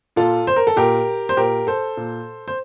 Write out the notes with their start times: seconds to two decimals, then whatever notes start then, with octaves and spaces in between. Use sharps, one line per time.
0.16 A#2 F4 A4
0.47 C5
0.56 A#4
0.67 A4
0.76 A#2 G4 A#4
1.29 C5
1.37 A#2 G4 A#4
1.67 A4 C5
1.97 A#2
2.48 C5